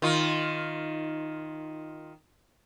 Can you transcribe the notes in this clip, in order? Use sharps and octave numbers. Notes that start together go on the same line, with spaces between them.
D#3 F4